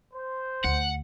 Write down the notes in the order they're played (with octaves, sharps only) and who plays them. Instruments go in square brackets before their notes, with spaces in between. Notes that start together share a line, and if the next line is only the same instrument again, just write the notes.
[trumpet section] C5
[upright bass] D2 [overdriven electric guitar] F#5